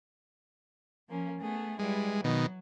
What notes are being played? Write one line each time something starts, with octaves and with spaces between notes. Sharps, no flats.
F3 A#3 C#4
A3 B3 G#4
G3 G#3 E4 B4
B2 D#3 F#3